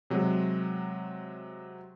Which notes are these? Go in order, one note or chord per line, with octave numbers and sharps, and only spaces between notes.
C3 F#3 G#3 C4